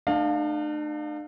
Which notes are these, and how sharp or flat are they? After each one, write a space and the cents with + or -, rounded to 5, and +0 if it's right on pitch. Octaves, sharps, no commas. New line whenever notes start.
A3 +0 D4 +45 F5 +15